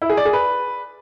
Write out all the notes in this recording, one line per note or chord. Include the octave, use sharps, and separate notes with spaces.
E4
G#4
D5
G#4
B4